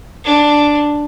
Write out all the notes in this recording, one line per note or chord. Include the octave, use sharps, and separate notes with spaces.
D4